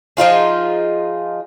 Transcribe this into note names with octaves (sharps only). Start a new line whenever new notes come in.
F3 D#4 F4 G#4